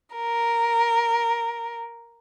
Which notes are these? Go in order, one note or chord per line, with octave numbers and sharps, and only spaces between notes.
A#4